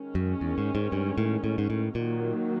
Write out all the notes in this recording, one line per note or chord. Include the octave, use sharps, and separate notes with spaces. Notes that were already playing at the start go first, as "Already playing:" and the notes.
Already playing: D#3 G#3 C#4
F#2
E2
G#2
G#2
G2
A2
A2
G#2
A2
A#2 D#3 F#3 A#3